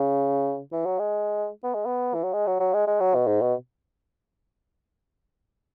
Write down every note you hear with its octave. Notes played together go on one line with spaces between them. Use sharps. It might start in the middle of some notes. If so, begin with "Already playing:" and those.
Already playing: C#3
E3
F#3
G#3
B3
G#3
B3
E3
F#3
G#3
F#3
F#3
G#3
G#3
F#3
B2
G#2
B2